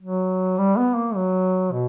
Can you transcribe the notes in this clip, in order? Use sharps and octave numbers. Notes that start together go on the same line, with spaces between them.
F#3
G3
B3
A#3
F#3
B2